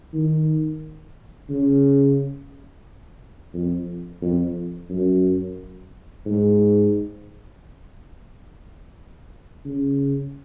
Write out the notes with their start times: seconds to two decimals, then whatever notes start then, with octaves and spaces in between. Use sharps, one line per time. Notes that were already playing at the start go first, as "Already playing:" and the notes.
0.14 D#3
1.49 C#3
3.54 F2
4.21 F2
4.89 F#2
6.26 G#2
9.65 C#3